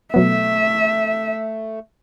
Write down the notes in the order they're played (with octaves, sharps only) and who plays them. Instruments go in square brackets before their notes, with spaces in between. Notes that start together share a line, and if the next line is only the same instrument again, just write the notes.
[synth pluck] B2 F#3 B3 [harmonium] A3 [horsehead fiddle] E5